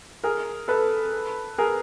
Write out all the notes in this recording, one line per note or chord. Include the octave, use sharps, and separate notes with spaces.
G#4 A#4
A4 B4
G#4 A#4